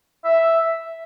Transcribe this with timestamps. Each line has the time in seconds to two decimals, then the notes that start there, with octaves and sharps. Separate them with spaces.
0.25 E5